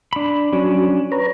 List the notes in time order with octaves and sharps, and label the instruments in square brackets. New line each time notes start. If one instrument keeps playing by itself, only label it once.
[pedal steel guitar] D4 B5
[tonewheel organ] F#3 [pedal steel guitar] C#4 D4
[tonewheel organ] B4 C#5 A#5